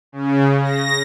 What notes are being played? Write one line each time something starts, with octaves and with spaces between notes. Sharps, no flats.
C#3
A#6